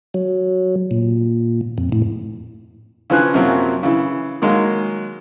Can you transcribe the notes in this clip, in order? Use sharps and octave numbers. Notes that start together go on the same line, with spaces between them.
F#3
A#2
F2
A2
C#3 E3 F3 B4 G#5 F#6
F#2 C3 F3 F#3 A#3
C#3 E3
D#3 F#3 G#3 A#3